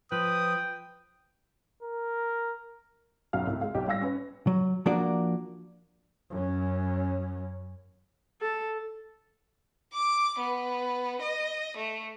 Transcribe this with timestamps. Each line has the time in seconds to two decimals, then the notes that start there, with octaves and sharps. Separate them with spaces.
0.12 F3 B4 G5 D#6
1.83 A#4
3.33 B1 F#2 F#4 F5 F6
3.47 C2 A2
3.61 G#3 F5
3.74 B1 D#4 G4
3.88 G3 F5 E6 A#6
4.01 C#4 B4
4.47 F#3
4.86 F3 A#3 D4 F#4 A#4 D5
6.30 F#2 C#4
8.41 A4
9.93 D6
10.39 B3
11.21 D#5
11.77 A3